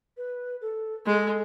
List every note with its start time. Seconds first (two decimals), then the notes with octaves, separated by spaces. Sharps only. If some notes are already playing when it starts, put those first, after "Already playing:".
0.16 B4
0.61 A4
1.06 G#3 A4